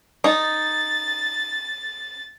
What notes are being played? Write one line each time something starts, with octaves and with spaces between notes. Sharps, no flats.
D#4 A6